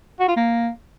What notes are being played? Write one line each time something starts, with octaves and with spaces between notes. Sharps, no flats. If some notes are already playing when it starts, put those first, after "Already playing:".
F#4
F4
A#3